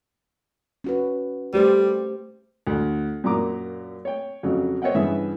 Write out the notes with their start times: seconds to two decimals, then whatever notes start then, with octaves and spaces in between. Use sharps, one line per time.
0.84 C#4 F#4 B4
1.54 G3 A3 G4 C5
2.67 D2
3.24 F#2 A#2 F#3 A#5 D6 D#6
4.05 C#5 G5
4.43 F2 C#3 F#3
4.82 C5 C#5 D#5 E5 F#5 G5
4.94 G2 C#3 E3 B3 G#4 E5